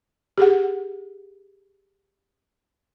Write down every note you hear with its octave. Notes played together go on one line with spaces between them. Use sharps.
G4 G#4 F#5